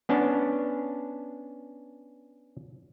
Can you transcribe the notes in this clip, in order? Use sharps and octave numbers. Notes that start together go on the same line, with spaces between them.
B3 C#4 D4 A5